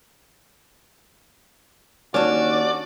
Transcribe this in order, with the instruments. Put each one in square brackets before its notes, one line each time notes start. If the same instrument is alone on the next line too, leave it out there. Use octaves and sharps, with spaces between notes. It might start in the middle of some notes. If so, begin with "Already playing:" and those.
[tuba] D#2 [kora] C#4 D4 [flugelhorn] F#4 [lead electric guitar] D5